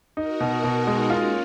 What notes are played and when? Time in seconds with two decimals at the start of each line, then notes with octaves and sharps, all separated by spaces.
0.17 D#4 F#4 A#4
0.40 B2
0.64 B2 D#4 F#4
0.87 G#3
1.09 A#3 C#4 F4